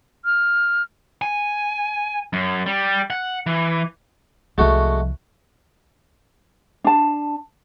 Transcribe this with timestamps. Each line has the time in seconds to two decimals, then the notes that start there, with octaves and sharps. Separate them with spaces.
0.25 F6
1.22 G#5
2.33 F#2
2.66 G3
3.10 F#5
3.46 E3
4.58 C2 F3 G#3 A3 F#4
6.84 D4 A5